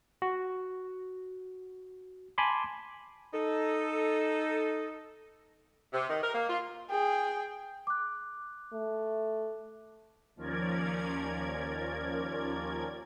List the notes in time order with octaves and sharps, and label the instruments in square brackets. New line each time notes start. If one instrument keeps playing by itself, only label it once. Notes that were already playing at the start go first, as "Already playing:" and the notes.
[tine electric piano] F#4
G#5 A5 B5 C6 D6
[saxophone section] D#4 A4
C3
D#3
A#4
A#3
F4
[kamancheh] G#4 G5
[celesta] D6 F#6
[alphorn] A3
[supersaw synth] D#2 F3 C#4 A#4 D5 G#6